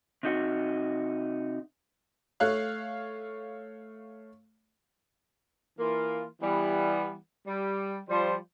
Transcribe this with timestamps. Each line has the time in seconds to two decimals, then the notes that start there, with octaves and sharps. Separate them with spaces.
0.23 C3 D#4 F#4
2.40 A3 C#5 F5 F#6
5.79 E3 A#3 F4
6.41 E3 G3 B3
7.47 G3
8.09 F3 G3 C5